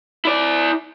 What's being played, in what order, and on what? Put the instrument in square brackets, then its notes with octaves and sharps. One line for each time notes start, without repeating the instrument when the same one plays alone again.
[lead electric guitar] E4 D5